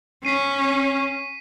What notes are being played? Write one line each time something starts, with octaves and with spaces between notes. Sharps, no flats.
C#4 B6 C7 D#7